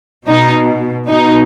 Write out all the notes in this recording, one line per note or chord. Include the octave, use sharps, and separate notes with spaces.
B2 D#4
B2 D#4